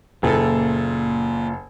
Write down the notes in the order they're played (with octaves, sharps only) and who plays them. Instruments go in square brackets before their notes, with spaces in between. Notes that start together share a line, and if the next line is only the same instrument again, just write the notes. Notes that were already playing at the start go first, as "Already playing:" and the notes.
[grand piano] F#1 A4 [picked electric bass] A#2